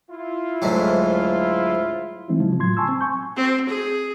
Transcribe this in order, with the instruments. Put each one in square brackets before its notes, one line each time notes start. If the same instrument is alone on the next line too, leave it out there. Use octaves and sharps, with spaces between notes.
[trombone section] E4 F4
[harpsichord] D2 G#2 F#3
[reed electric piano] E3 F3 G#3 C4 D#4 E4
C#3 F3 F#3
A2 F#3 F4 C6 G#6
G#5 A5 C6 C#6 E6 G#6
C4
G#5 C#6 G6
[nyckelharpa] C4
G#4